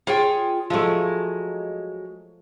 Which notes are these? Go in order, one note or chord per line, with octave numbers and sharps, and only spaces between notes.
F4 G#4 C#5 G5
F3 F#3 G#3 A3